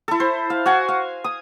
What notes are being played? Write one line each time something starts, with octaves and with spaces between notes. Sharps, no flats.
E4 A4
C5
F5
F#4 F#5 G#5
F5
D#6